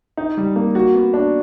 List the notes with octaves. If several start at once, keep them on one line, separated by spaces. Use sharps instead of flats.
D#4
G3
A#3
F#4
B3
D4